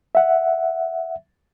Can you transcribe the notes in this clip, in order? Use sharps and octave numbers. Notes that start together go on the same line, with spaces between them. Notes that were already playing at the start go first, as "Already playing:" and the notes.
E5 F#5